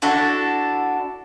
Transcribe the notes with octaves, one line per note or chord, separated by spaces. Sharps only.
D4 E4 F#4 A4